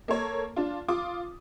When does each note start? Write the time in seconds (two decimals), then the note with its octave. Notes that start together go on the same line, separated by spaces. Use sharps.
0.08 A#3 A4 C#5
0.56 D4 F4
0.88 F4 D6 D#6